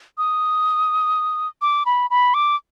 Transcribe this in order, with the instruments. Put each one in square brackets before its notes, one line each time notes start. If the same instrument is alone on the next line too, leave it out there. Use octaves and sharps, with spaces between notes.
[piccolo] D#6
D6
B5
B5
D6